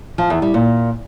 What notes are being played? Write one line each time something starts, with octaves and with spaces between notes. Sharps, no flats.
F3
E2
G3
A#2